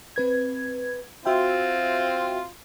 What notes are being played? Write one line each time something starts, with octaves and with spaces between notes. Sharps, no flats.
C4 B4 G#6
C4 F4 F#4 E5 G5